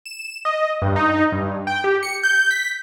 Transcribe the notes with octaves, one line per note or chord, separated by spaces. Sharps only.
E7
D#5
G2
D#4
G2
G5
G4
C#7
G6
B6